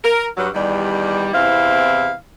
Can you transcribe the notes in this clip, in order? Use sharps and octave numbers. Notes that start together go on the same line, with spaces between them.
A#4
G2 F#3
E2 D#3 G3
E2 C3 C4 E4 F5